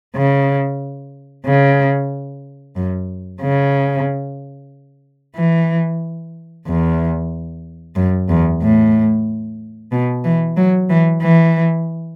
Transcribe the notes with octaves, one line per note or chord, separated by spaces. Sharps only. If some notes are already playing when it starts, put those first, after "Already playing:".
C#3
C#3
F#2
C#3
E3
E2
F#2
E2
A2
B2
E3
F#3
E3
E3